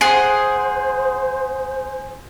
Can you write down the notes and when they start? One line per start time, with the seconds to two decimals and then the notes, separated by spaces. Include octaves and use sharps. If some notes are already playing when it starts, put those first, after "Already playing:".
0.01 G#4 C5 F#5 G#5 C6